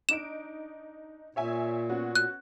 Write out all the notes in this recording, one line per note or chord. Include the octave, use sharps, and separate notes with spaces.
D4 D#4 D7 E7
A#2 C#5 E5 G#5
B3 C#4 F#4
F#6